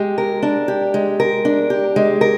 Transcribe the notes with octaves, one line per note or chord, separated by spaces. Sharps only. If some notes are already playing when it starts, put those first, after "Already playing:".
Already playing: G#3 G4
A#4
D4
G4
G#3
A#4
D4
G4
G#3
A#4